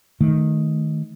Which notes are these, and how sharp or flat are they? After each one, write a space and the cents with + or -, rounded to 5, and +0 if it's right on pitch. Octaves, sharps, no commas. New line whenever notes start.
D#3 +0 A3 -10